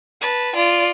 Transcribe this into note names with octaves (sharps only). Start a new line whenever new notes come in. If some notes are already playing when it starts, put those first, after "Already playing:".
B4 A5
F4 D5